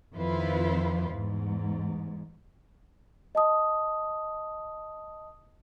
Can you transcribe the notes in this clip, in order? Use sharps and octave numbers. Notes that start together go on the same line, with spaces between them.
F2 D#3 E4 F4 B4 C5
E2 G#2
D#5 A5 D#6